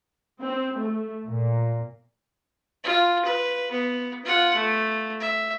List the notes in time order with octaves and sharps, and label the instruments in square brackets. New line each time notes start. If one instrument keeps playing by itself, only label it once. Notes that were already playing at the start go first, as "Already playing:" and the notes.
[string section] C4
A3
A#2
[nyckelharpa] F4
B4
B3
F4 F#5
A3
E5